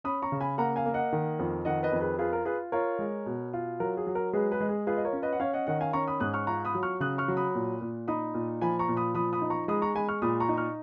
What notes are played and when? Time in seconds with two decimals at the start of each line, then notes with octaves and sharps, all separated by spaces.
0.04 C#4 B5 D#6
0.22 A#5 C#6
0.32 C#3
0.41 G#5 B5
0.58 A#3 F#5 A#5
0.76 F5 G#5
0.86 A#3
0.94 D#5 F#5
1.13 D#3
1.39 F2
1.65 D#3 D#5 F#5
1.83 B4 D#5
1.92 F2
2.01 G#4 B4
2.19 F4 G#4 B4
2.33 A#4
2.45 F4 G#4 B4
2.72 F4 A#4 C#5
2.99 G#3
3.26 B2
3.53 F4
3.80 F#3 A#4
3.97 G#4
4.07 F#3
4.15 A#4
4.33 G#3 G#4 B4
4.51 G#4 B4
4.60 G#3
4.69 G#4
4.87 F4 G#4 B4
4.97 D#5
5.05 A#4 C#5
5.13 C#4
5.22 B4 D#5
5.33 F#5
5.40 C#4 C#5 F5
5.53 D#5 F#5
5.67 D#3 D#5 F#5
5.81 F5 G#5
5.93 C#4 A#5 C#6
6.07 B5 D#6
6.20 G#2 D#6 F#6
6.34 C#6 F6
6.47 F4 A#5 C#6
6.65 B5 D#6
6.75 F#3
6.83 C#6 F6
7.00 C#3 D#6 F#6
7.18 C#6 F6
7.28 F#3
7.37 B5 D#6
7.55 A#2
7.81 A#2
8.08 D#4 B5 D#6
8.34 A#2
8.61 F3 G#5 B5
8.79 A#5 C#6
8.88 A#2
8.97 B5 D#6
9.15 F3 B5 D#6
9.33 B5 D#6
9.42 D#4
9.50 A#5 C#6
9.68 G#3 B5 D#6
9.82 A#5 C#6
9.95 G#3 G#5 B5
10.08 C#6 F6
10.22 A#2 B5 D#6
10.40 A#5 C#6
10.49 D#4
10.57 C#6 F6